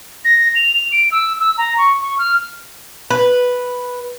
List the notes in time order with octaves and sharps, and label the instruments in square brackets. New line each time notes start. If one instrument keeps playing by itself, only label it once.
[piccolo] A#6
F7
D7
E6
E6
A#5
C#6
C#6
F6
[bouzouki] B4